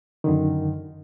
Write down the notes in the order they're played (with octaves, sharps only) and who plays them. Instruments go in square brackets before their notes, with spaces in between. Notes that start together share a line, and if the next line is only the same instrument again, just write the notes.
[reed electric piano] F#2 D3 D#3